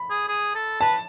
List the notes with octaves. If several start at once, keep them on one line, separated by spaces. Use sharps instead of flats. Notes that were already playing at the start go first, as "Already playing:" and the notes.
Already playing: B5
G#4
G#4
A4
B4 A5